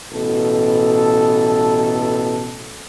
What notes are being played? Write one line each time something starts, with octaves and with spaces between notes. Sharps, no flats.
A1 B2 A4